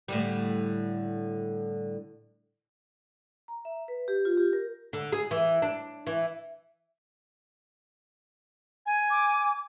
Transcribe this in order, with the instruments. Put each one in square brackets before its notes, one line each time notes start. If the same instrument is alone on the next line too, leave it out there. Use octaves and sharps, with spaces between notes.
[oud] A2 D3 G3
[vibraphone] A#5
E5
B4
G4
F4
G4
A#4
[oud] D3
G#4
E3
D4
E3
[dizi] G#5
[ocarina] D6